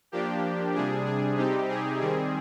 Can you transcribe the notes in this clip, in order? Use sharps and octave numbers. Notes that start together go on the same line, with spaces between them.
F3 A#3 D4 G4
C3 G3 D4 G#4
G#4
C3 G3 C4 D#4 G4
G#4
D#3 G3 C4 G#4